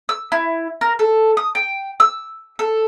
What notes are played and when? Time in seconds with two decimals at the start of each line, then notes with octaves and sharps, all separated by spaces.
0.09 E6
0.32 E4
0.81 A#4
0.99 A4
1.37 D#6
1.55 G5
2.00 E6
2.59 A4